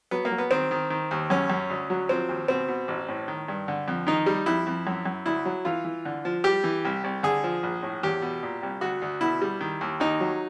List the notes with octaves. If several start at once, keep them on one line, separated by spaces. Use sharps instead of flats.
F#3 B3
A#3
F#3
B3
D#3 C4
D#3
D#3
D#2
F#2 C#4
F#2
D2
F#3
F3 C4
D#2
B2 C4
B2
A1
A2
D#3
G2
D3
F2
D#3 D#4
G3
F2 E4
F2
F#2
F#2
D2 E4
F#3
E3 F4
E3
D3
F3
G3 G4
E3
C2
C2
D3 G#4
F3
A#1
A2
E2 G4
B2
A#2
C2
D2 F#4
D2
B2 E4
G3
D#3
D#2
D#2 D#4
F#3